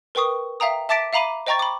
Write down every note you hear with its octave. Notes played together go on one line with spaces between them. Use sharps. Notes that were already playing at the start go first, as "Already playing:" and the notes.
A#4 B4 G5 C#6 D#6
E5 F5 G5 A#5 D#6
E5 A5 D6 A6 B6 D7
E5 F5 A#5 B5 D6 D#7
C5 D#5 G5 A#5 C#6 A6
B5 D6